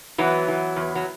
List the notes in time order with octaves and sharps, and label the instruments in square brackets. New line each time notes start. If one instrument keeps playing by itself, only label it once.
[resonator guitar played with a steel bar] E3 F#3 B3
E3
E2
F#3